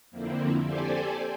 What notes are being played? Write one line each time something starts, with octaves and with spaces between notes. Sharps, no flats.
F2 D3 F3 A#3 C4 E4
G4 A4 C5 D5 G#5